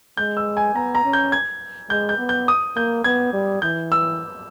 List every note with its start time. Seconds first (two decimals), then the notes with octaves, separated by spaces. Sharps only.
0.17 G#3 G6
0.37 E6
0.57 G#5
0.75 B3 A#5
0.95 A#5
1.04 C#4
1.13 G6
1.32 G#6
1.90 G#3 G6
2.09 G6
2.18 B3
2.29 G6
2.48 D#6
2.76 A#3 G6
3.04 B3 G#6
3.33 G3
3.62 E3 G6
3.92 E6